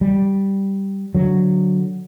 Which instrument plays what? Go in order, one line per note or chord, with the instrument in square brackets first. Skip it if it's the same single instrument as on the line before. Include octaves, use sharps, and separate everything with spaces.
[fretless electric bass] G3
D3 F#3